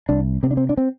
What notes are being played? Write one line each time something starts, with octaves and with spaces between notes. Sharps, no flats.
C2 D4
C3 C4
D4
C4
D4
C4